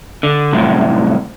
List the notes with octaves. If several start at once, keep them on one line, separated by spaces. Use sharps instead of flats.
D3
C2 F#2 A2